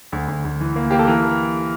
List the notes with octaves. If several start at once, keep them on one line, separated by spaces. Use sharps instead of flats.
D2
D2
D2
E3
A#3
A#3 G4
A4
E3 A#4